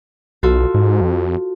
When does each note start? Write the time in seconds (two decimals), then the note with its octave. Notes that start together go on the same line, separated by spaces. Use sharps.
0.43 B1 F4 F#4 A4
0.74 G#2
1.01 F2